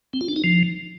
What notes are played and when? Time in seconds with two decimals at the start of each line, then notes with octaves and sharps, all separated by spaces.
0.13 C4
0.21 F4
0.29 D4
0.36 D#4
0.44 F3